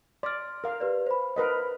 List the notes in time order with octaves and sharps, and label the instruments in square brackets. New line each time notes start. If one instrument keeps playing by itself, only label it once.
[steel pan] D5 [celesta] C6 F6
[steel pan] A#4 F5
[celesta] G4 B4 D5
C5 B5
[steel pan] A#4 B4 D#5